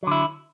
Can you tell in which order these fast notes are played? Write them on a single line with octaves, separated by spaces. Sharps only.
F#3 D3 E4